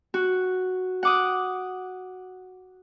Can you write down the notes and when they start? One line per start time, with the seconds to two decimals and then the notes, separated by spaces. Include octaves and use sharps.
0.14 F#4
1.03 F#5 D6 D#6